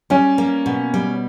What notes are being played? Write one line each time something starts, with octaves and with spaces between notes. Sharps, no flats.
G3 C#4
A#3
B2
G3